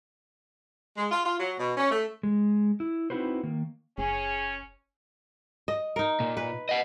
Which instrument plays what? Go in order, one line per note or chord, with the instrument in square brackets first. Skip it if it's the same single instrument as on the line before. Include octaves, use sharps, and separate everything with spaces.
[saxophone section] G#3
F4
F4
F#3
B2
C#4
A3
[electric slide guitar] G#3
E4
C4 D#4 E4 F#4 B4 C5
D#3 A#3
[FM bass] F#1 [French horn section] C#4 [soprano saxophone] G#4
[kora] D#5
D#4 A#4
[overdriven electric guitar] A#2
[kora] B4
[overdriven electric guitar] D#5 F#5